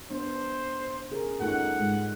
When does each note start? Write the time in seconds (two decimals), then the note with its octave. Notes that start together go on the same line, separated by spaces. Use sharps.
0.11 B3 D4 C5
1.10 C#3 G#4 A#4
1.40 G2 A3 C#4 D#4 F4 A4 F#5
1.79 G#2 G#3